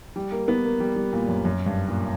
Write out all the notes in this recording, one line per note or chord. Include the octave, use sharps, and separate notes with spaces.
G3
A#3
B3
A#3
G3
G3
A#2
F#2
F#2
G2
A#2